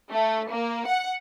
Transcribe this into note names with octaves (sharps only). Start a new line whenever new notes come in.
A3
A#3
F#5